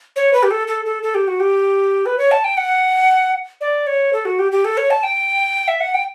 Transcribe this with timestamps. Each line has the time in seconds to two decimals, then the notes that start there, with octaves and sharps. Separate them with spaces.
0.16 C#5
0.33 B4
0.43 G4
0.51 A4
0.67 A4
0.85 A4
1.03 A4
1.15 G4
1.28 F#4
1.40 G4
2.06 B4
2.18 C#5
2.31 A5
2.44 G5
2.57 F#5
3.61 D5
3.87 C#5
4.13 A4
4.25 F#4
4.39 G4
4.52 G4
4.65 A4
4.77 C#5
4.90 A5
5.03 G5
5.68 E5
5.80 F#5
5.94 G5